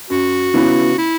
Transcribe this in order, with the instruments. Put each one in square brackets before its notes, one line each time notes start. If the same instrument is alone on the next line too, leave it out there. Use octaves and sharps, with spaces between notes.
[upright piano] F#2 [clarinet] F#4
[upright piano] C#3 E3 B3 E4
[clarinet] E4